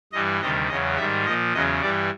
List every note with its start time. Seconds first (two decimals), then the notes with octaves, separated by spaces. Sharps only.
0.13 G2 E3 G3 D#5
0.41 D2 C3 D#3 G3 D#5
0.69 E2 C#3 F#3 D#5
0.97 G#2 D#3 G3 E5
1.25 A#2 F3 D#5
1.53 E2 C#3 F#3 D#5
1.81 G2 E3 G3 D5